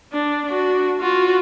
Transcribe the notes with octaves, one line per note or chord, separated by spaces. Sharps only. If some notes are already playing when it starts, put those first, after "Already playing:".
D4
D4 F#4
F4 F#4